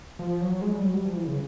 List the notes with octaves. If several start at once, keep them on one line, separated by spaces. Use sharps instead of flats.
F3
F#3
G#3
G3
F#3
G3
F3
E3
C#3